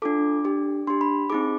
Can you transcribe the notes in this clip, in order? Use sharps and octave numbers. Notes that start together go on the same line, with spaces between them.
D4 F4 A4 D6
D4 G4
D4 G4 C6
B5
C4 D#4 G#4 D6